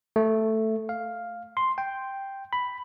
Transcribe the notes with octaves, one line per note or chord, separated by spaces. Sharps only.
A3
F5
C6
G5
B5